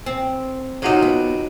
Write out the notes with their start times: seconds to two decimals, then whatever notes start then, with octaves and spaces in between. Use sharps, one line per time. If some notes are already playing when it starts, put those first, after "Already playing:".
0.06 C4
0.82 C3 F#3 C#4 D#4 F4
1.02 B3